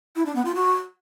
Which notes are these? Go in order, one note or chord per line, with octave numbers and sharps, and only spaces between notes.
E4
D4
B3
F4
F#4